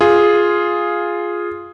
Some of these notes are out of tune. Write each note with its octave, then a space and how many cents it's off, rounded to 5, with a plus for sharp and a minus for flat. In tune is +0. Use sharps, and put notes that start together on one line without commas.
F4 +0 G#4 +0